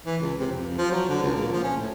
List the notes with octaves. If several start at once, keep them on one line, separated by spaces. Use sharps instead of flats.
E3
C#2
C3
F2
F3
F#3
D3
C#2
A#2
F3
C#4
A2